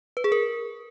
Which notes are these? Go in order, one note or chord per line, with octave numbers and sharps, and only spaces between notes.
B4
G#4
A#4